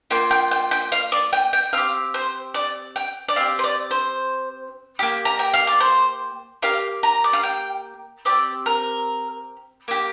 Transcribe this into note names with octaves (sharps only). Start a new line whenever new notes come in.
A#3 F4 G5
G5
G5
G5
F5
D5
G5
G5
C4 G4 F5
C5
D5
G5
D5
C4 G4 F5
C5
D5
C5
A#3 G4
A#5
G5
F5
D5
C5
A#3 G4 F5
A#5
D5
F5
G5
C4 G4 D5
A#4
A#3 G4